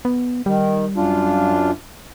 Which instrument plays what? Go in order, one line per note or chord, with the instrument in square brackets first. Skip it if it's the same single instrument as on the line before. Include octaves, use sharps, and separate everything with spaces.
[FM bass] B3
[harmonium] D#3 [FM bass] G3
[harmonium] F#2 D4 F4